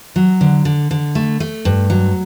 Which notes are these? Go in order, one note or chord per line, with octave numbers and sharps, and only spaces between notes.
F#3
D3
D3
D3
A3
A3
G2
F#3